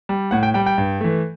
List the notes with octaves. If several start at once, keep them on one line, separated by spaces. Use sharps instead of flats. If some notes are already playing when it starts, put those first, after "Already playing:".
G3
A2 F#5
G5
G3 G5
G5
G2
E3 A3